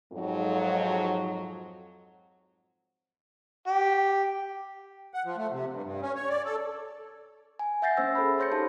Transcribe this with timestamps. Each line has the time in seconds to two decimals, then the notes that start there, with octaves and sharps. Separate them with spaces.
0.13 F2 G#2 F#3
3.67 G4
5.14 F#5
5.25 F3
5.37 A3
5.52 C3
5.72 G2
5.83 G2
6.02 C#4
6.15 C#5
6.29 D5
6.45 A4
7.59 G#5
7.82 E5 F#5 G6 A6 A#6 C7
7.97 A#3 C#4 C5 E6 A#6
8.15 G#4 A4 C5 B5
8.38 A4 C#5 C6 G6 A#6 C#7
8.52 D#4 G4 A4 F5 A5